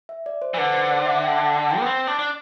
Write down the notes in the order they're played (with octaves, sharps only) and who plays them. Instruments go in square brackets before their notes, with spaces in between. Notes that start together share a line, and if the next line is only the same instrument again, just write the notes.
[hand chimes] E5
D5
C5
[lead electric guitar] E3
[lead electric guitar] D3 [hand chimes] B4
[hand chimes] C5
D5
E5
G5
A5
G5
[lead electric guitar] B3
C4
D4
D4